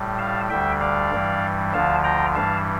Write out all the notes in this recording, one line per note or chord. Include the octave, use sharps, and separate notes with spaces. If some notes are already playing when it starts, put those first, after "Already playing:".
Already playing: A2 G3
F5 A5
D2 D3 G3 E5 G5
D5 F5
G2 E3 G3
D2 D3 F3 F5 A5
G5 A#5
G2 E3 G3 F5 A5